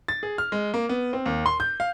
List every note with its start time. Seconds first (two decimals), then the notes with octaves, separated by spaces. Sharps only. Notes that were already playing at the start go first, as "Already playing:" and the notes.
0.08 A6
0.23 G#4
0.38 F6
0.52 G#3
0.74 A#3
0.89 B3
1.13 C4
1.26 D#2
1.46 C6
1.60 G6
1.80 F5